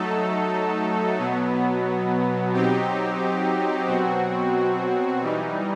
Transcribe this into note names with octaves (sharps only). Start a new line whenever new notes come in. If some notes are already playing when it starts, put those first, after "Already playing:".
Already playing: F#3 A3 D#4 A4
B2 F#3 B3
F#3 C4 D#4 G4
B2 F#3 C4 F#4
E3 G3 D#4